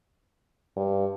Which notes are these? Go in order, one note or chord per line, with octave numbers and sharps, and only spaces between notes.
G2